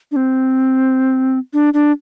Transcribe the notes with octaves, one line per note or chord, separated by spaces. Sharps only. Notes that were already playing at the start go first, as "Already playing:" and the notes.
D4
C4
D4
D4